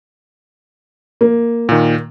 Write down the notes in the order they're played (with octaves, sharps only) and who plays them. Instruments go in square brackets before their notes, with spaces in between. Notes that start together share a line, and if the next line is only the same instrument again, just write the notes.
[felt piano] A#3
[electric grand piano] A#2 D#3